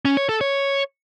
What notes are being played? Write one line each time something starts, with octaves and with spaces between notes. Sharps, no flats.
C#4
C#5
A4
C#5